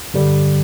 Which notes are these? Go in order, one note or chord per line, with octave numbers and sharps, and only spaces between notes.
G2 D3 G3